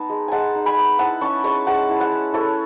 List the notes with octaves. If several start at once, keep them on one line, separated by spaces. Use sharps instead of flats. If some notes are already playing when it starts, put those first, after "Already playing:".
Already playing: B3 D#4 A5
G#3
G#3 F#5 G#5 A5
D#4
G#5 B5
B3
E4 F#5 A5
C#4 A5 C#6
G#3 A5 C#6
G#3 F#5 A5
E4
F#5 A5
C#4
E4 A4 C#5